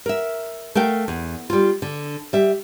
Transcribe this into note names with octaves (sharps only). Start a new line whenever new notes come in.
A#4 E5
A3 A#4 F5 G5
E2
G3 F4
D3
G3 E5